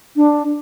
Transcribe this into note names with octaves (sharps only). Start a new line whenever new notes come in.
D4